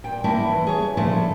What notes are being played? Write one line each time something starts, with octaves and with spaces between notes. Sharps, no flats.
A#2 G5
G#2 A#3 C#4 E4 A5
E3
G#4 C#5
A#2 C#3 F3 E4 A4 A5